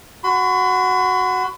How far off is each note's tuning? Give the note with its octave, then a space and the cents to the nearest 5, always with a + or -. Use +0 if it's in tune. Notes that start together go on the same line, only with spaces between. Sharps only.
F#4 +0 B5 +45